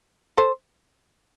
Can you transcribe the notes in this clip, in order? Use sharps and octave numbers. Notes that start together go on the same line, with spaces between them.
A4 C5